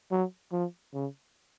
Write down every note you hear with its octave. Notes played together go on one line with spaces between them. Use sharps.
F#3
F3
C#3